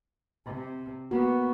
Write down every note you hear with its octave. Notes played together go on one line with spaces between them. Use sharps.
C3
A#3 B3 F#4